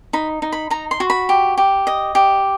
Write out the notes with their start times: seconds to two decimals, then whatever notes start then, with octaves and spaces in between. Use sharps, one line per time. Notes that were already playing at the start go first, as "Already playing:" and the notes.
0.13 D#4 B5
0.42 D#4
0.52 B5
0.70 D#4 A#5
0.91 C6
1.00 F#4
1.10 B5
1.29 G4
1.57 G4
1.87 D#5
2.15 G4